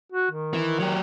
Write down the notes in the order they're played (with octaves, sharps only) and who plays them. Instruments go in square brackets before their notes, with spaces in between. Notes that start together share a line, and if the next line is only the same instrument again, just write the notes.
[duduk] F#4
D#3
[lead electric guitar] E3
F#3 G4